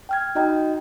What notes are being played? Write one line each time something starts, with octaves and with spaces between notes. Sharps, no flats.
G5 F6 G#6
D#4 F#4 D#5 G5 A#5